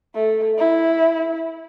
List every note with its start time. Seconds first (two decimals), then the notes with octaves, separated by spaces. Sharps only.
0.15 A3
0.58 E4